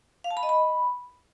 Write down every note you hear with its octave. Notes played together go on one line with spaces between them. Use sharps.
F5
A5
B5
D#5
B5